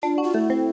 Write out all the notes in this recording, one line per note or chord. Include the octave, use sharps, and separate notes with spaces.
D4 F4
F#4
F4
A3 E4
C4